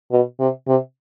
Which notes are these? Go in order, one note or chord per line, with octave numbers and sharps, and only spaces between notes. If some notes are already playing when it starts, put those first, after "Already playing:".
B2
C3
C3